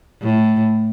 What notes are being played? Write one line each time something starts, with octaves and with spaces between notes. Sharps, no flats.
A2